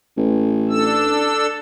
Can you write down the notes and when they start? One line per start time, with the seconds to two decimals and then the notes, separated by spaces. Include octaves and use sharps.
0.17 A1
0.70 D4 A4 E6